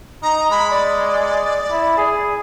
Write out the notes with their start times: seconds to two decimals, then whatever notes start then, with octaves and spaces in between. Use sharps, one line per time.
0.23 D#4 A#5
0.51 G#3 B5
0.71 D5
1.71 E4
1.98 G#4